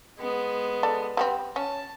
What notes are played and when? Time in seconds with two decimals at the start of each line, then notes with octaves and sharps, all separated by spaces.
0.19 G#3 B3
0.83 A4 D5
1.17 G3 B3 C4
1.56 C#4 A5